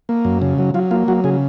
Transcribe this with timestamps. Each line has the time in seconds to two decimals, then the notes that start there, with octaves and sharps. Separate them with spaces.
0.09 A#3
0.25 F#2
0.42 C#3
0.58 F#3
0.74 F#3 F4
0.91 A#3 F4
1.08 F#3 F#4
1.24 C#3 G#4